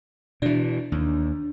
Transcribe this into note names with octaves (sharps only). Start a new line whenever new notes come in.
B2 E3 D4
D#2